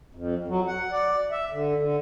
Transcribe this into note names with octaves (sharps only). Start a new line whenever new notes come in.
F2
F#3
F#5
D5
E5
D3
D3